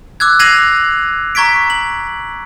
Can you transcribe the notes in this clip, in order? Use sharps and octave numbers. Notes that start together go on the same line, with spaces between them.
D6 E6 F#6 G#6
G#6 A#6 C7 D#7 F7 F#7
A#5 C#6 G#6 B6 D7
F#7